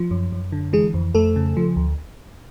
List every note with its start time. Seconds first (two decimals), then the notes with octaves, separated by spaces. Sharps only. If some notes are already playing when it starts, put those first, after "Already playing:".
Already playing: F3
0.11 F#2
0.32 F#2
0.52 D3
0.73 E3 G#3 G#4
0.94 F2
1.14 F2 A3 A4
1.36 C#3
1.57 F3
1.76 D2